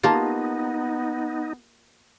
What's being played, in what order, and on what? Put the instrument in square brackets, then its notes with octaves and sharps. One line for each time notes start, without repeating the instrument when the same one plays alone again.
[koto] A#3 F4 [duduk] B3 [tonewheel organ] D#4 [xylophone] G4 A5